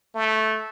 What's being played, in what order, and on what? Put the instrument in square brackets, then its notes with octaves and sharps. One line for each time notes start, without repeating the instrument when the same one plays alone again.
[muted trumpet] A3